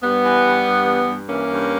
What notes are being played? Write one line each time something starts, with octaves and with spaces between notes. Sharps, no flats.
G2 G3 B3
E3
G2
G2
E3
G2
E3 A#3 C#4
G2